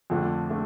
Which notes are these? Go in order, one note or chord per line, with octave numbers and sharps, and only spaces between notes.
F2 D3 F3 A3 D4
A3 D4